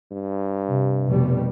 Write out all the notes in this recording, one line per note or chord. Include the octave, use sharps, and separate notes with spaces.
G2
C3
F1 B2 G3